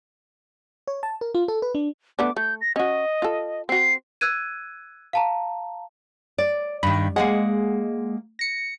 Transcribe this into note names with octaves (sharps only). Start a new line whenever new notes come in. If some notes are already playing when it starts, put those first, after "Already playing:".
C#5
A5
A#4
F4
A4
B4
D4
A3 B3 D4 D6
A3 G6
A#6
C#4 F#4 D#5
F4 A4
C4 F#4 C7
E6 F#6 G#6 D#7
F5 A5 A#5
D5
G2 D#3 B5
G#3 A#3 G#4 F#5
A#6 C#7